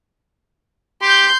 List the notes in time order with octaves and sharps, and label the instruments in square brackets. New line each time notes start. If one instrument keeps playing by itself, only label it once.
[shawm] G4 [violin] C6 G6